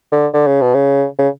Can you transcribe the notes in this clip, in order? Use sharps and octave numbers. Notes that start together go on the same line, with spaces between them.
D3
D3
C#3
B2
C#3
C#3